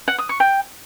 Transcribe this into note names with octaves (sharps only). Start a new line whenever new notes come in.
F#5
D#6
C#6
G5